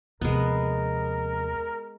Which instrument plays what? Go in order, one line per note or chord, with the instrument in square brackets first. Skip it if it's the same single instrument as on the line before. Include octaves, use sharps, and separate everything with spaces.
[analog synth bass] D#2 [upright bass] C3 F3 [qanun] G#3 B3 [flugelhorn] A#4